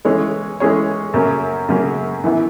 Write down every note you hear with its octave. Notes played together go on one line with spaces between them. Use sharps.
E3 G#3 C#4 G#4 C#5
E3 G#3 C#4 G#4 C#5
F#2 C#3 F#3 A#3 C#4
F#2 C#3 F#3 A#3 C#4
F#2 E3 B3 E4